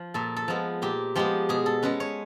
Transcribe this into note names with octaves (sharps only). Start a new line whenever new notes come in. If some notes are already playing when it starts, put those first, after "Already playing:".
Already playing: F3
A#2 A4
A4
F3 G#3 B3
A#2 G4
F3 G#3 B3 G4
B2 G#4
A4
G#3 C#4 B4
C#5